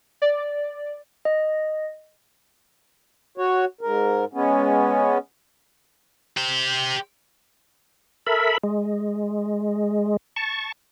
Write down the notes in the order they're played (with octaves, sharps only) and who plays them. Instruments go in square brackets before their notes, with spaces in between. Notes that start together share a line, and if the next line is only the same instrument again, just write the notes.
[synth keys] D5
[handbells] D#5
[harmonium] F#4 C#5
G#2 A#4
G#3 B3 C#4
[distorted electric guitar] G4 C5
[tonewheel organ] A4 A#4 E5 B5
G#3
A5 C#6